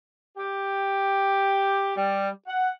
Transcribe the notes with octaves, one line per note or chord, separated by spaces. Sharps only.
G4
G3
F#5